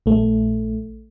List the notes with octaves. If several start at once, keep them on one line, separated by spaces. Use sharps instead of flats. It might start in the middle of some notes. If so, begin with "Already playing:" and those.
A#1 A3